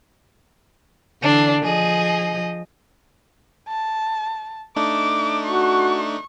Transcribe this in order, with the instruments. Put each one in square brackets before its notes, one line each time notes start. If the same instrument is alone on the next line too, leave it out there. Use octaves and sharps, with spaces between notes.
[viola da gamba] D3 E3 [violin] D4 C7
[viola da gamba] F3 D#5 [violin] G#4
[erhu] A5
[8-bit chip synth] A3 D4 D#4 [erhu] D6
[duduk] F#4 [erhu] C#6